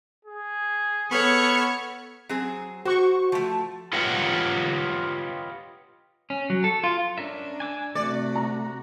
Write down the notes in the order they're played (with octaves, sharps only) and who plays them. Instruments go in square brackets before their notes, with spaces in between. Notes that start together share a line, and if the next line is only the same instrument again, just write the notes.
[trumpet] G#4
[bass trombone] B3 [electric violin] A4 C#5 [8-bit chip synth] B5 C#6 F6
[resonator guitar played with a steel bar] F#3 C4 G#4
[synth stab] F#4 C#6 [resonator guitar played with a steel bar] C5
[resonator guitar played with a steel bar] F3 A3
[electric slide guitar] F4 G4 B4 C#5 D#5 F#5
[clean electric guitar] C#4
F#3
A4
F4
[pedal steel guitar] C#4 A#4 E5 [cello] D4
[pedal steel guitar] G#5 D6 E6
[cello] C3 F#4 [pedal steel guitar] A3 [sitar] D5
[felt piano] A#5